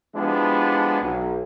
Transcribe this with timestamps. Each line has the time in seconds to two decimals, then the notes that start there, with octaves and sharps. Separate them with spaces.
0.14 F3 G#3 B3 D4 E4 G4
1.02 B1